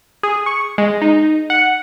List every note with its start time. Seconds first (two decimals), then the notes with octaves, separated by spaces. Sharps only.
0.23 G#4
0.46 C#6
0.78 G#3
1.02 D#4
1.50 F#5